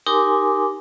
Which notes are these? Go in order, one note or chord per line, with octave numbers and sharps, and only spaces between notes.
D#4 G4 A#4 G#5 C6 D6